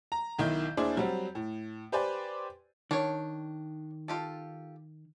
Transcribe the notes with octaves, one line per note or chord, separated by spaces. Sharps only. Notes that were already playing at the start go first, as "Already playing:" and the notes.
A#5
B1 D#3 E4 G6
D#2 D4 E4 G#4 C5 D5
F#3 G3 C4
A2
G4 B4 C5 D5 G#5
D#3 D4 C#5
F4 G4 A4